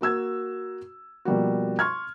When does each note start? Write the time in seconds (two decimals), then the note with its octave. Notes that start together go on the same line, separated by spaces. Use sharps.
0.01 A#3 F#4 E6 G#6
1.25 B2 F3 G3 A#3 F#4
1.79 C6 C#6 F6 G#6